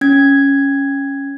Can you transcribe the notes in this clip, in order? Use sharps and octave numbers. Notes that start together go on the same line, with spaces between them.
C#4 G#6